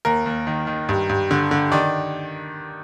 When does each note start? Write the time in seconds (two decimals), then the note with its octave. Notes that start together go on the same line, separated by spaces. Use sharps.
0.05 D#2 A#4
0.26 D#2
0.47 D#3
0.67 D#3
0.89 G2
1.09 G2
1.31 D3
1.51 D3
1.72 D#3 D5